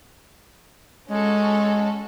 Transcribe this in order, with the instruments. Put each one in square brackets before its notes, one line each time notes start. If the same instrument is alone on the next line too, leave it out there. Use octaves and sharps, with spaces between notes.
[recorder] G#3 [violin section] C#4 F#4 A4